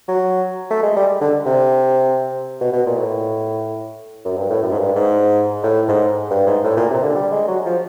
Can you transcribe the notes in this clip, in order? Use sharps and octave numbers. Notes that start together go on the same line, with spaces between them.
F#3
A3
G#3
G3
D3
C3
B2
B2
A#2
A2
F#2
G2
A2
F#2
G#2
G2
G#2
A2
G#2
G2
G#2
A2
A#2
C3
D3
G3
G#3
F#3
F3